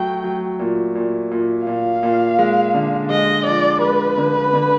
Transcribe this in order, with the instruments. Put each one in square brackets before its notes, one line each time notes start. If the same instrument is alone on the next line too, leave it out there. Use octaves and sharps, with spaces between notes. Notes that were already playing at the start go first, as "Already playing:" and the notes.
Already playing: [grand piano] F#3 A3 [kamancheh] G5
[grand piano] F#3
A#2
A#2
A#2
[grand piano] A#2 [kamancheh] F5
[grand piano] A#2
G#3
D3
[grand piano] G#3 [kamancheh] D#5
[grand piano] F3 [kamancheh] D5
[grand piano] G#3 [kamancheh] B4
[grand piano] D3
D3